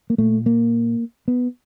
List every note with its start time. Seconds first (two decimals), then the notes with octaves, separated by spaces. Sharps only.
0.10 A#3
0.18 A#2 A3
0.46 A#3
1.28 B3